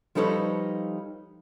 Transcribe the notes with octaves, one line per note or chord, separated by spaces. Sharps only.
F3 G3 D#4 A4 B4 C#5